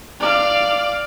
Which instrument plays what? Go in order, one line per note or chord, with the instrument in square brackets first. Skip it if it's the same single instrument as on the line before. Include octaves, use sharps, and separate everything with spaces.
[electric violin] D5 F5